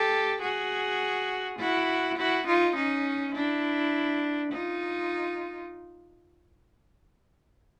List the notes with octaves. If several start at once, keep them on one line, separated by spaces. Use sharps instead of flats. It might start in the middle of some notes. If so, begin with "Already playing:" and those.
Already playing: G4 A4
F#4 G#4
E4 F#4
E4 F#4
D#4 F4
C#4 D#4
D4 E4
D#4 F4